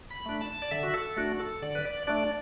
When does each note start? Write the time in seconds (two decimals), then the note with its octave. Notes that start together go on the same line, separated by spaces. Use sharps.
0.10 B5
0.26 A3 D4
0.41 A5
0.62 D5
0.71 D3 E5
0.83 F#4
0.94 A4
1.16 A3 D4 F#4
1.39 A4
1.62 D3 D5
1.75 B4
1.85 D5
2.07 A3 D4 D5